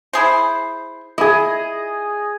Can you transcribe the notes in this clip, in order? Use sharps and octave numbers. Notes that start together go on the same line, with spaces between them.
E4 G#4 C5
E4 G#4 D#5